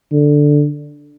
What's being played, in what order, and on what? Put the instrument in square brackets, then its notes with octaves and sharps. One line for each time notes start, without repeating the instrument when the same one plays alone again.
[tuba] D3